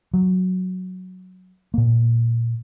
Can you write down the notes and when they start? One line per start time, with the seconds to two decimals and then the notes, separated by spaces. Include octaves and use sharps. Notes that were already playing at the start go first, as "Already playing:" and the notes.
0.14 F#3
1.74 A#2 A#3